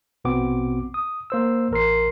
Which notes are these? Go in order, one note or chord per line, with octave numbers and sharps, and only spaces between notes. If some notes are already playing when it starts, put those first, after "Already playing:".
A#1 B2 B3 C4 D6
D#6
A#3 C5 E6
A1 A#4 C6 C7